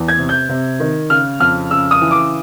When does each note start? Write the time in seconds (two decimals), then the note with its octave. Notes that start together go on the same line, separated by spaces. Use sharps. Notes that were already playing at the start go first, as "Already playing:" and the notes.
Already playing: E2
0.08 G#6
0.19 C3
0.29 G6
0.49 C3
0.80 D#3
1.10 C#3 F6
1.40 F2 F6
1.71 C#3 E6
1.91 D#6
2.01 E3
2.11 D6